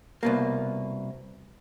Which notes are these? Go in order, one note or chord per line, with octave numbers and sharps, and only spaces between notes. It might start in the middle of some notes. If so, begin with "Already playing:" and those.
C2 B2 A#3